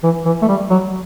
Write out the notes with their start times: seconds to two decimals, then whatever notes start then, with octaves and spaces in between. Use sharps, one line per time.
0.03 E3
0.25 E3
0.42 A3
0.48 G3
0.70 F#3